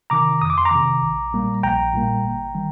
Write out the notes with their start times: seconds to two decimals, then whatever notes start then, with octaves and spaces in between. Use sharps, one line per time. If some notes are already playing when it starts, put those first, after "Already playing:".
0.10 C3 D#3 A#5 D6
0.42 F2 D#6
0.50 D6
0.58 C6
0.65 A#5 D6
0.71 C3 D#3
1.02 A#1
1.33 A#2 G3 A#3
1.63 A#1 G5 A#5
1.94 A#2 G3 A#3
2.25 G1
2.55 D#3 G3